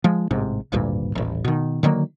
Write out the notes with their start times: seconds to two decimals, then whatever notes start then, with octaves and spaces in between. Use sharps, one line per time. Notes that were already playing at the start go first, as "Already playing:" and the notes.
0.04 F3 G#3
0.31 A1 G#2 C3
0.72 G#1 D2 G2 A#2
1.15 D#1 A1
1.45 B2 D#3
1.83 D3 D#3 F#3 A#3